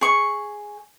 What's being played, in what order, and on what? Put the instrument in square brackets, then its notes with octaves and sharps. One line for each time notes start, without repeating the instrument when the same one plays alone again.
[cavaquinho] G#4 C#6